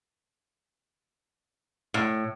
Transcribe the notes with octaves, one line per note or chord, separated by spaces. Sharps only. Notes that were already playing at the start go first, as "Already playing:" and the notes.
A2